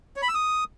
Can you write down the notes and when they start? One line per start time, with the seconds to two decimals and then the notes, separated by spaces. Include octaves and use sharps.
0.16 C#5
0.22 B5
0.28 E6
0.35 D#6